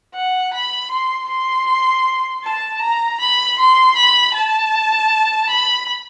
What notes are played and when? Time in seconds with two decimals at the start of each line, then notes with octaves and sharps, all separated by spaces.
0.15 F#5
0.54 B5
0.91 C6
1.30 C6
2.44 A5
2.81 A#5
3.20 B5
3.59 C6
3.96 B5
4.34 A5
5.49 B5